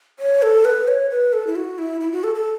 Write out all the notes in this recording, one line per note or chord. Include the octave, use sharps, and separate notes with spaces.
C#5
A4
B4
C#5
B4
A4
E4
F#4
E4
E4
F#4
A4
A4